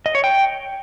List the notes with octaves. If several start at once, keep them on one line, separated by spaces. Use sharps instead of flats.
D#5
C#5
G5